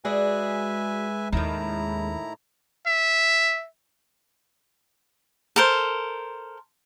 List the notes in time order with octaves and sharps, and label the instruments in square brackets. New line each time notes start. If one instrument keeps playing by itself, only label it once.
[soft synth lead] G#3 [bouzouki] F#4 G#4 D5 [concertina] B4 E5 G#5
[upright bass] D#2 C#4 [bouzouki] A2 D#3 [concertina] E4 A#5
[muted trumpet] E5
[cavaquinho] A4 A#4 C5